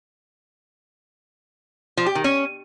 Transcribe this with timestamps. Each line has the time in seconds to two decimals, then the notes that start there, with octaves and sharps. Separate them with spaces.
1.97 F3
2.06 G4
2.15 D#3
2.24 C#4